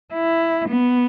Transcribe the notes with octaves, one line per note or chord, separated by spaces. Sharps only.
E4
B3